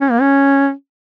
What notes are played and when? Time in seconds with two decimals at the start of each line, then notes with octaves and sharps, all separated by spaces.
0.01 C#4
0.11 A#3
0.21 C#4